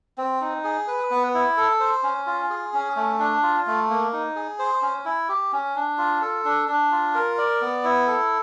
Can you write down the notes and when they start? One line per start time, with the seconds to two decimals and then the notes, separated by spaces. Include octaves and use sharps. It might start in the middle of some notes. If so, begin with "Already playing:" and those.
0.18 C4
0.41 D#4
0.64 G#4
0.87 B4
1.10 B3
1.34 E4
1.57 A4
1.80 C5
2.03 C#4
2.26 F4
2.50 G#4
2.73 C#4
2.96 A3
3.19 D4
3.43 F4
3.67 A3
3.89 A#3
4.13 D#4
4.36 G#4
4.59 C5
4.82 C#4
5.05 E4
5.29 G4
5.53 C#4
5.76 D4
5.98 F4
6.22 A4
6.45 D4
6.68 D4
6.92 F4
7.15 A#4
7.38 D5
7.61 B3
7.84 E4
8.07 A4